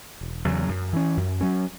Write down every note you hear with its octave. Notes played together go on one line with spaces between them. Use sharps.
E1
E2 C#3 F#3
F#2
E3 C#4
F#2
F#3 C#4